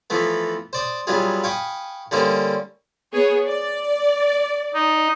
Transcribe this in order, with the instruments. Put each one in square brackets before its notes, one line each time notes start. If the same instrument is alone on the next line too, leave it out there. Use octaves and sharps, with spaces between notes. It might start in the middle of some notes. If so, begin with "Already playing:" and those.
[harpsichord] E3 F3 A3 B3
C5 D5 D#6
F#3 G3 B3 D#4 F4 G#4
F5 G5 G#5 B5 C#6 D#6
D3 G3 A#3 C#4 D#4 C5
[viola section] B3 G#4 C#5
D5
[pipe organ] D#4